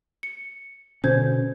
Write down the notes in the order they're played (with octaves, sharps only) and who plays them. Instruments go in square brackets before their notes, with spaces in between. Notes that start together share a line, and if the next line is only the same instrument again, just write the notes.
[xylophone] C#7
[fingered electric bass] B2 D3 C#4 [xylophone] C5 G6 G#6